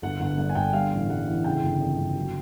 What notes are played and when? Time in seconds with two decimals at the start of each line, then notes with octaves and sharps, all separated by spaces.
0.02 G1 F#5
0.20 G1 F#5
0.38 G2 F#5
0.49 G#5
0.55 G1 G5
0.73 G3 F5
0.92 A1
1.09 G3 F#5
1.28 E3
1.44 C#3 G5
1.63 G1
1.80 F2
1.98 G1
2.16 F#3